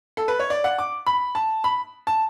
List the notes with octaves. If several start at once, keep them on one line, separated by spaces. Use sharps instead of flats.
A4
B4
C#5
D5
F#5
D6
B5
A5
B5
A5